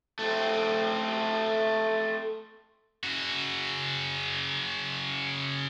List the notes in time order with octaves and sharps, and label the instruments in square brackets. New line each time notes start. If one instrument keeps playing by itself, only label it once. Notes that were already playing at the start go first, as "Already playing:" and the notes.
[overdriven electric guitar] A3 C4
[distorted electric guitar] C#3 F#4